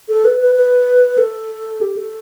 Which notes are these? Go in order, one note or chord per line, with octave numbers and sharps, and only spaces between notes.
A4
B4
B4
B4
A4
G4
A4